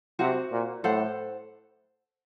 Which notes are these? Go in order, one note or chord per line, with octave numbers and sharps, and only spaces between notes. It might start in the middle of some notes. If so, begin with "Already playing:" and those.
C3 F#4 C5 F#5
A#2
A2 A4 C5 F#5